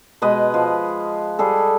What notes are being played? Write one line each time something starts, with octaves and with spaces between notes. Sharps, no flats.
B2 G#3 B4 D#5
F3
G3 G#4 A4